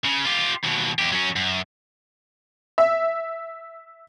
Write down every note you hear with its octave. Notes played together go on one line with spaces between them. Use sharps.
C#3
F4 G4
D#2 B2
E2 G4
F#3 C#4
F#2
E5